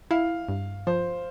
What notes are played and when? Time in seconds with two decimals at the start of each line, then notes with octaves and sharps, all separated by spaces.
0.11 E4 F5
0.49 G2
0.87 F3 C5